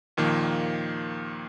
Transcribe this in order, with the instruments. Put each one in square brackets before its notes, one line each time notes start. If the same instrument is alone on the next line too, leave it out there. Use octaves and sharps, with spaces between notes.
[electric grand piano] D#2 A#2 D#3 F3 A#3